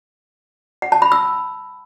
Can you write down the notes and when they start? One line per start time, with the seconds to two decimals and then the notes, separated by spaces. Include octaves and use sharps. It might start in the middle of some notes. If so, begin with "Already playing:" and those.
0.82 F#5
0.92 A5
1.02 B5
1.12 E6